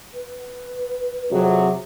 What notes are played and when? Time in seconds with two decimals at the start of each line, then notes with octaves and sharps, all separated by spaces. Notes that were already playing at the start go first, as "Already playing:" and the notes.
0.14 B4
1.31 F2 C3 F#3 G#4